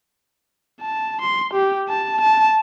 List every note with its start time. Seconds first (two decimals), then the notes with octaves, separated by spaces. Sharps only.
0.81 A5
1.21 C6
1.53 G4
1.89 A5
2.21 A5